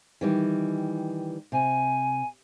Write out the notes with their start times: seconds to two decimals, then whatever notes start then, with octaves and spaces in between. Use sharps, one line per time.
0.21 D#3 E3 G3
1.52 C3 G#5